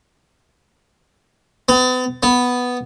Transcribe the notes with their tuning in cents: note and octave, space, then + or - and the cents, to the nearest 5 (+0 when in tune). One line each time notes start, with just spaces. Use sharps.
B3 +40
B3 +0